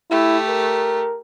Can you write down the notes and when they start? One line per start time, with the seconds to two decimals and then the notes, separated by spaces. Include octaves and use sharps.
0.11 A3 E4 G4
0.49 A#4